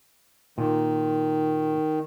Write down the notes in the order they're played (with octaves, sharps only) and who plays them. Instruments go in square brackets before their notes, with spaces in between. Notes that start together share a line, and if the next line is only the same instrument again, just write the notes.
[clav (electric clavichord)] A#2 [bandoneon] D#3